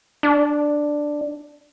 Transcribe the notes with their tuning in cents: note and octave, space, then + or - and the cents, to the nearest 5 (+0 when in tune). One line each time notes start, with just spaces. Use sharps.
D4 +5